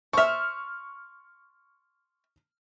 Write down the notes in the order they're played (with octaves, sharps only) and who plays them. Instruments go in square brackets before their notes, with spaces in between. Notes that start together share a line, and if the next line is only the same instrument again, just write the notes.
[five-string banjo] C5 E5 [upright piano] C#6 F6